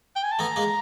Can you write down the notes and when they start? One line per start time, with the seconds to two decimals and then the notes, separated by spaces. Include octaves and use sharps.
0.16 G5
0.23 G#5
0.31 A5
0.39 A3 B3 A#5
0.56 G#3 A#3